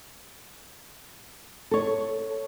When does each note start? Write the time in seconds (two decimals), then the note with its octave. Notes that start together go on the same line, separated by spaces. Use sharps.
1.71 A4 C#5